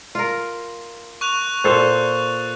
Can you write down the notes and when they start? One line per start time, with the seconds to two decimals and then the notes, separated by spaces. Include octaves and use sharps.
0.15 F4 A#4
1.21 C#6 F#6 F7
1.64 A#2 A4 C5